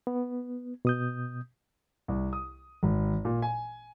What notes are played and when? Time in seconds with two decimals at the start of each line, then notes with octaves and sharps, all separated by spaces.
0.07 B3
0.85 B2 D#6 G6
2.08 C2
2.33 D#6
2.83 G#1
3.25 A#2
3.42 G#5